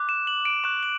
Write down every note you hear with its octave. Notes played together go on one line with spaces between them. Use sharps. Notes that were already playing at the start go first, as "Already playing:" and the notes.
Already playing: D6 F#6
E7
F#7
D7
C#6 F#6 E7
F#7